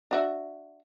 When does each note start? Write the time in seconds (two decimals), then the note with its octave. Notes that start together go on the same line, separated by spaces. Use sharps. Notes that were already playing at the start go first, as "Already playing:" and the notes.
0.11 D4 F#4 E5